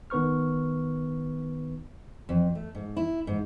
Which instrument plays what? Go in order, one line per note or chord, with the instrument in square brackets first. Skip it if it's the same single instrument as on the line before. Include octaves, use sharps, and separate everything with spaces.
[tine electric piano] D#3 B3 B4 C#6 F6
[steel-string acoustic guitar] F2
A3
G#2
E4
G#2